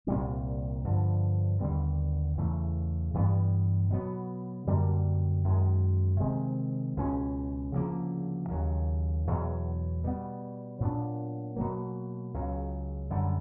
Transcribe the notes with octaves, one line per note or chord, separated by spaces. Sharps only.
C2 A#2 G3 C4
G2 D3 F3
D#2 D3 G3 B3
E2 C#3 E3 A3
G2 E3 G3 B3
B2 F#3 B3
F#2 D3 G3 A#3
F#2 D#3 G#3
C3 D#3 G#3 C4
C#2 B2 G#3 C#4
D2 C#3 F3 A#3
D#2 C#3 F#3
E2 B2 F#3
B2 G3 B3
A#2 F#3 B3 D4
B2 F#3 A#3
C#2 C#3 F#3
F#2 D3 G3